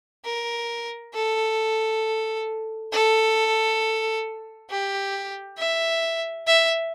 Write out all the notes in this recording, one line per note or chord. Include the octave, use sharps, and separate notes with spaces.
A#4
A4
A4
G4
E5
E5